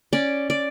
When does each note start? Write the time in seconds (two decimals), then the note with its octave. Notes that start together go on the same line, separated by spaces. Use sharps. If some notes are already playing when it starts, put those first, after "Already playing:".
0.13 C#4 D5
0.50 D5